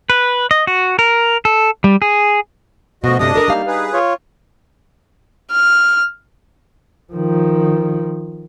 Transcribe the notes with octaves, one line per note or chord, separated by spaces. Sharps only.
B4
D#5
F#4
A#4
A4
G3
G#4
D2 B2 F3 A3 F#4 D#5
G2 C3 A3 D4 D#5 D#6
A4 A#4 D5
G3 A#3 D#4 F5
D#4 G#4 B4
F4 C#5
F6
D#3 F3